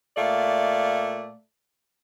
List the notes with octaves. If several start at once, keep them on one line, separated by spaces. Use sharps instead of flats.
A#2 A3 D5 F5